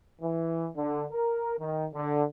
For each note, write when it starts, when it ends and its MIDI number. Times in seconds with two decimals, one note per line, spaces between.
0.22 0.68 52
0.75 1.04 50
1.11 1.57 70
1.58 1.86 51
1.92 2.22 50